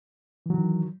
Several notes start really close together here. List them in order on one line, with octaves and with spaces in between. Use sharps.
E3 F#3 D#3